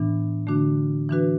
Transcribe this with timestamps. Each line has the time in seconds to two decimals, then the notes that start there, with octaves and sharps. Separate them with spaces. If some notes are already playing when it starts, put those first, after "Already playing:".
Already playing: A2 E3 B3 D4
0.47 D3 A3 D4 F#4
1.09 E3 D4 F#4 B4